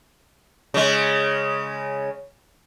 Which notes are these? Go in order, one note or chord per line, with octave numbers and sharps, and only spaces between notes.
C#3 G#3